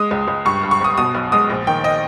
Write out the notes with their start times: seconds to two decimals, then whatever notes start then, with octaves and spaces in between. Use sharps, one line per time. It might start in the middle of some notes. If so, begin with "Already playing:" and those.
Already playing: G#3 D#6
0.11 C#2
0.28 C#2
0.45 G2 C#6
0.63 G2
0.71 C#6
0.81 G1 D#6
0.98 B2 D#6
1.15 B1
1.32 G#3 D#6
1.50 A#1
1.67 D#3 G5
1.84 D#5